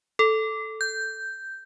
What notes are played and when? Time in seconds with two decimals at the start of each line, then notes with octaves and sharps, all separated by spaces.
0.19 A4
0.81 G6